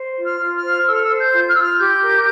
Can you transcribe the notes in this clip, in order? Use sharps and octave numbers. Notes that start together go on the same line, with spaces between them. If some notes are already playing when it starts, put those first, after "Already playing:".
Already playing: C5
F4
F6
F4
F6
C5
A4 E6
F6
E6
C5
G6
F4
F6
F4 E6
F6
G4 G6
A#4